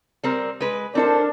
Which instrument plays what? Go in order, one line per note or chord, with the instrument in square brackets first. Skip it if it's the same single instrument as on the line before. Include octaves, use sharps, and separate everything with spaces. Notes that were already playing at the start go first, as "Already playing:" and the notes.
[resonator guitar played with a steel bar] G3 C4 A#4
G#3 B4
[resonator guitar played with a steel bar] C4 A4 C5 [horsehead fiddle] D4 [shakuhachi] A#4